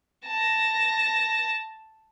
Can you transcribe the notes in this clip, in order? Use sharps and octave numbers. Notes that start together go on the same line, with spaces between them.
A5 A#6